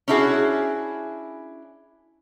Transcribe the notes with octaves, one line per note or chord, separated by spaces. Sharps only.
C#4 D4 E4 F#4 G#4